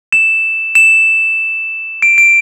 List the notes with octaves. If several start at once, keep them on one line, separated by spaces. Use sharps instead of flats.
E7
E7
D7
D7